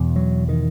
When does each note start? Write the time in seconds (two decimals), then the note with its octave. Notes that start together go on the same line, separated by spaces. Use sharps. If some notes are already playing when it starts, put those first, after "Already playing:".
Already playing: E2 B2
0.16 F#3
0.49 D#3